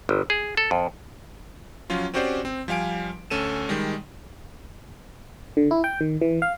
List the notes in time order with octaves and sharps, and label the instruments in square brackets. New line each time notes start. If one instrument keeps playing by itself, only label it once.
[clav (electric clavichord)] G1
G#4
A4
F2
[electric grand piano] F3 F#3 C#4 F4
C4 C#4 F#4 G4 C5 D5
C4
F3 G3 F5 G#5 D7
D2 C#4 A4 D#7 E7
D#3 G3 G#3
[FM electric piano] D3
E4
G5
D#3
E3
F5